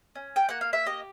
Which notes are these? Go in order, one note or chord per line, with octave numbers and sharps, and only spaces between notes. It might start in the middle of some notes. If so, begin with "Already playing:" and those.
C#4
G5
A#3 F#5
F5
E5
G4 D#5